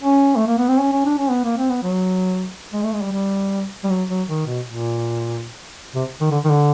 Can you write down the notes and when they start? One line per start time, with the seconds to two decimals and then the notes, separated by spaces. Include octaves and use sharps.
0.02 C#4
0.36 A3
0.47 A#3
0.58 B3
0.68 C4
0.80 C#4
0.92 C#4
1.05 D4
1.18 C#4
1.30 B3
1.44 A#3
1.57 C4
1.69 B3
1.83 F#3
2.73 G#3
2.83 A3
2.93 G#3
3.02 G3
3.12 G3
3.84 G3
3.90 F#3
4.09 F#3
4.28 D#3
4.46 B2
4.66 A#2
5.95 C3
6.21 D#3
6.31 D3
6.44 D#3
6.50 D3